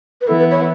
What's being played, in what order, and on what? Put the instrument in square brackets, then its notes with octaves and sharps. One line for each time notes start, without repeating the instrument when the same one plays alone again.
[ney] B4
[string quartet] E3 B3 E4 [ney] A4
[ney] B4
C#5